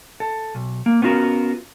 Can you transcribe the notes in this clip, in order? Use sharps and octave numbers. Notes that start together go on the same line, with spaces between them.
A4
B1
A#3
B3 C#4 F4 F#4 A#4